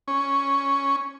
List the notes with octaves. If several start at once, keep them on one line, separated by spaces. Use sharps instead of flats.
C#4